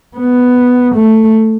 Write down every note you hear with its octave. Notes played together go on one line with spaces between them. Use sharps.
B3
A3